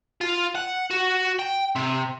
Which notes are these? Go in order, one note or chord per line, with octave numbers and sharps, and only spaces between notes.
F4
F#5
F#4
G5
C3